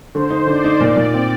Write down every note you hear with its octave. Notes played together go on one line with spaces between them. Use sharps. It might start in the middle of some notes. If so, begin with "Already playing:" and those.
D3 C5
D#4
D3 D5
D#4
A#2 D5
A#2
C4